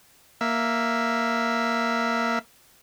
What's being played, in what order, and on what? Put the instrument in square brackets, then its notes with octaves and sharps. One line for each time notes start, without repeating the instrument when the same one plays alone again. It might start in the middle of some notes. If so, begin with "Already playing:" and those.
[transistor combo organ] A#3 E5